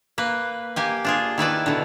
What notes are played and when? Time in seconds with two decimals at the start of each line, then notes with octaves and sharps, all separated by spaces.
0.18 A#3 B4
0.76 A#3 G4 G#5
1.05 D4 F4 G#4
1.38 D#3 E4 B4 D5
1.66 B2 D3